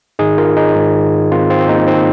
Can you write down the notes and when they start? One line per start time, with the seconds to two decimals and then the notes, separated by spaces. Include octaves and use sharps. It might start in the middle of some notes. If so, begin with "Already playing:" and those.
0.19 G#2 D#3 D#4 G#4
0.38 F4 A#4
0.57 D#4 G#4
0.75 G#2 D#3
1.31 G#2 D#3 C4 F4
1.50 C4 F4
1.61 C4
1.69 A#3 D#4
1.87 D#3 C4